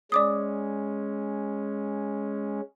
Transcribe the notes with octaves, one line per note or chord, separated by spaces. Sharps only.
G#3 C#4 D5 D6 D#6